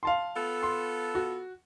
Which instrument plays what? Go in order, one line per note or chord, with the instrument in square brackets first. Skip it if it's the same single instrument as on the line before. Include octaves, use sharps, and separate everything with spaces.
[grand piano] F5 A5 C6
[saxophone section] B3 F4 A4
[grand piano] C6
F#4